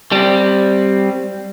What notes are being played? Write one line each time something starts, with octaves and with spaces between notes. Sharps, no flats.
G3 C4